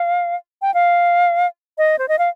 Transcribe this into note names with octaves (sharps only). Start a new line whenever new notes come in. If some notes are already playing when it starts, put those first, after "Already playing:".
Already playing: F5
G5
F5
D#5
C5
D#5
F5